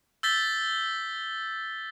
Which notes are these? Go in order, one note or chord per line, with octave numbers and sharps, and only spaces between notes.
E6 G6 A6 B6 G7